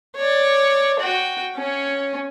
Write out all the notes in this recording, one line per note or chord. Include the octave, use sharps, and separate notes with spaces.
C#5 D5
F#4 G5
C#4 C#5